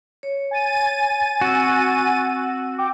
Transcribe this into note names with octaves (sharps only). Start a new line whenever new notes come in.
C#5
G#5 A6 D#7
C4 F#4 E6
G5 D6